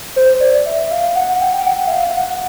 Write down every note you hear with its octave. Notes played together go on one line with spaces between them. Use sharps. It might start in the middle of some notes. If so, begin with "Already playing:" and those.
C5
D5
E5
F5
F#5
G5
G5
F#5
E5
F5
F#5